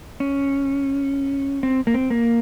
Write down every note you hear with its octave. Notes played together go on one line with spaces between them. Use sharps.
C#4
C4
A#3
C4
A#3